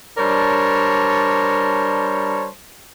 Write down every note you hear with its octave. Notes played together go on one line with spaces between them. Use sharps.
G3 D4 A#4 C5 C#5 A5